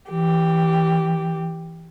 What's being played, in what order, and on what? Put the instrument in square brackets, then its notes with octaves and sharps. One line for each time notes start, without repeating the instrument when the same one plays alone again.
[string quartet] E3 G4